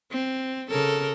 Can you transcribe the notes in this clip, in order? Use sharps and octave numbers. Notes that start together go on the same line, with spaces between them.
C4
C#3 A4 A#4